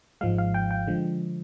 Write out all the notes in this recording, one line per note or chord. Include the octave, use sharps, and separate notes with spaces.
G#1 G#2 F3 G#3 F5
F5
G5
G5
D3 F3 G#3